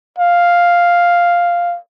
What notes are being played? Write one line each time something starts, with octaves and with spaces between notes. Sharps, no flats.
F5